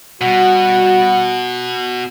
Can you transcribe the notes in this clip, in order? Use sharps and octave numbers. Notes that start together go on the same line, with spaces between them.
B2 G3 F#4 F#5